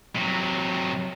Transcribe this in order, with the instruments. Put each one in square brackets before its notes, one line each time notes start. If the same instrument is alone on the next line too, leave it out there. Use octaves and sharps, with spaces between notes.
[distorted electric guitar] C3 F#3